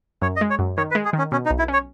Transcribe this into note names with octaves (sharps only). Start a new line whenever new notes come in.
F#2 C#5
D#5
G#3
C#5
F#2
D#3 C#5
B4
G#3
G#4
D#3
C#4
B2 C#4
D#4
B1
E4
C#4 C#5